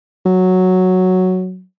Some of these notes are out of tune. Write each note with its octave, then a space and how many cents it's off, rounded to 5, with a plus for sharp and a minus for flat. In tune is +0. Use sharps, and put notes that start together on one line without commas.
F#3 +0